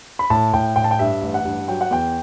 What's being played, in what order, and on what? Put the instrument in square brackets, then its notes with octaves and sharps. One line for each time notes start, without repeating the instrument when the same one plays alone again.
[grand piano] B5
A2 A5
A2 G5
A2 G5
A5
G5
G2 E5
A1
F#5
G2
F#3 G5
F#5
E2 G5